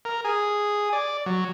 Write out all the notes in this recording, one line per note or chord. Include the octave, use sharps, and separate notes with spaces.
A#4
G#4
D5
F#3